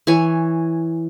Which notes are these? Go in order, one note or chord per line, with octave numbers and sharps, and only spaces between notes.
E3 C#5 G#5